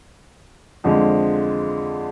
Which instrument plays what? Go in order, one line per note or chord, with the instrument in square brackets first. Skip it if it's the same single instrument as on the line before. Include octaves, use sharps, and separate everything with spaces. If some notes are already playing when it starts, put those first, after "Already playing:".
[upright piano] F2 D3 F3 G#3